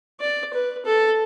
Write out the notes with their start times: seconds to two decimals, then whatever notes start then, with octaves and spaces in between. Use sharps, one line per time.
0.21 D5
0.54 B4
0.86 A4